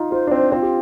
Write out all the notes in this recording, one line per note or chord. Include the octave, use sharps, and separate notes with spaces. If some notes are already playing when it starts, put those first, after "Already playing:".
Already playing: D#4 F4
F4 C5
D4
C4 C5
C4 F4
G4